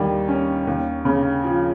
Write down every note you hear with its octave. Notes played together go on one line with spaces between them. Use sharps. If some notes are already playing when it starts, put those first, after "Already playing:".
Already playing: D#2 D#3 G3
C#4
D#2
C#3
F3